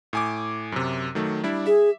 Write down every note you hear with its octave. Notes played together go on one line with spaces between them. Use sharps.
A2 G#5 D6
F#2 C3
D#3 F#3 A3
G3 D4 E4
G#4 E5